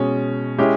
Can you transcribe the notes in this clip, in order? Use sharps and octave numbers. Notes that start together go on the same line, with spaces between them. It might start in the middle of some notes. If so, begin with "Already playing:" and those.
Already playing: B2 G#3 C#4
G#3 C#4 E4 G4